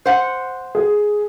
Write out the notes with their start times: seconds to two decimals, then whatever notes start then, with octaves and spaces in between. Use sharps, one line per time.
0.06 C5 F#5
0.75 G#4